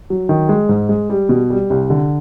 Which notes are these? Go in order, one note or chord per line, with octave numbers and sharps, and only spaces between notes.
F#3
D#3
G#3
G#2
G#3
G3
B2
G3
C2
D3